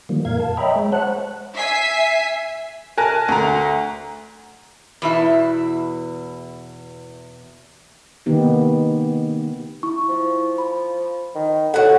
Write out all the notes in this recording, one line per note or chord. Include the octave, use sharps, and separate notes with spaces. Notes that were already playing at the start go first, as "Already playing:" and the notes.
D#3 F3 G3 A#3
F2 A#2 A#4 F5 G#6
A5
C#5 D#5 E5 G5 A#5 B5
G#3
C5 C#5 F#5 A5 F#6
E5 G#5 B6 C7
A#4 G#5 A5 F#6 A#6
D2 A#5
E2 B2 E4
C3 D#3 A#3 B3 D#4 G4
E4 C#6
F3
B5
D#3
A2 F#4 A4 C#5 F#5